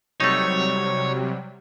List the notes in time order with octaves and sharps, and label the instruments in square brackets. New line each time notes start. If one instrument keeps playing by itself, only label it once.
[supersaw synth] C3 F#3 G3 [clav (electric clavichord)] A3 D#4 [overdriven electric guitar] C#5